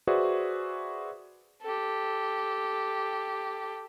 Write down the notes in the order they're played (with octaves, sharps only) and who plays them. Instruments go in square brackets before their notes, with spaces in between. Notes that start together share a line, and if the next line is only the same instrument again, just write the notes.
[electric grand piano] F#4 G#4 B4 C5 D5 E5
[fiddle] G4 A4